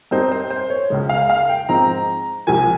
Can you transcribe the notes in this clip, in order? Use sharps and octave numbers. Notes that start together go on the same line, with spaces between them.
G2 G3 C4 D#4 C5
C5
C5
C#5
C#2 C#3 G#3
F5
F5
G5
G#2 F3 G#3 C4 A#5
C#2 C3 F3 G#5